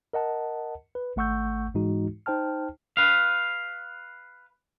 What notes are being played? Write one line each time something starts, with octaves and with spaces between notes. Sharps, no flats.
A#4 D#5 F#5 A5
B4
G#1 A3 F#5 C#6 E6 G6
G#2 E3 G#3 D#4 F#4
D#4 C5 G5 A5 F6
B4 F5